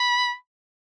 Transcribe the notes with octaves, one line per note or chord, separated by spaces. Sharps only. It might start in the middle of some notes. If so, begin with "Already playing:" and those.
Already playing: B5